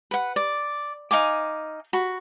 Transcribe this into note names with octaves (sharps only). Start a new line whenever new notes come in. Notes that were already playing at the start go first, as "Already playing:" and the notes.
B4 F#5
D5
D#4 F5 G#5 D6
F#4 B5